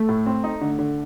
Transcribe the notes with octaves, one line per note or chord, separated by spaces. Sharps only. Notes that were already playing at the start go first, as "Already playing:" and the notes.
Already playing: A3
A2
C4
D#4
D3
D3